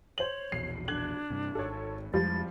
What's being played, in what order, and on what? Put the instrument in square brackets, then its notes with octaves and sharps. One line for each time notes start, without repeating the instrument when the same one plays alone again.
[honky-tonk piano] C5 F#7 [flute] C#5
[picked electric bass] A#1 E2 B2 [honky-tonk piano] C7
[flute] D4 [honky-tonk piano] F#6 G#6 F#7
[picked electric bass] G2 C3
[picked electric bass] G#1 [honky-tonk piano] A4 C#5
[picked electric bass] F2 G#3 [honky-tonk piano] F3 G3 [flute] A6